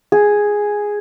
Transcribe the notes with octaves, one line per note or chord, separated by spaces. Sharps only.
G#4